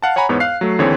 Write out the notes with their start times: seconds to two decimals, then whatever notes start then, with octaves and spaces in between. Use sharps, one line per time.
0.02 F5 F#5 A5
0.16 C#5 F#5 G#5 A#5 B5
0.29 E2 G#2 B3 C#5
0.40 F5 F#6 C7
0.61 F#3 A3
0.79 D#2 D3 E3 C4 G#4 C#5